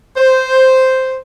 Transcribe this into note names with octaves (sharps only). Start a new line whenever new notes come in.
C5